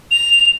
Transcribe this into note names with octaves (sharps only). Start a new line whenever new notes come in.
F7